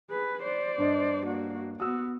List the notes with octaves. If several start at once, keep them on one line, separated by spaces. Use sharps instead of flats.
G#4 B4
C5 D5
G2 D4 D#5
A#3 F#4
B3 F#4 D#6 E6